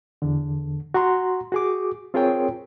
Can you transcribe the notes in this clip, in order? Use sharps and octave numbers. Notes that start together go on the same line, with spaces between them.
E2 D3
F#4 F#5 A#5 C6
F#4 G#4 D6
C4 F4 G#4 A#4 C#5 G5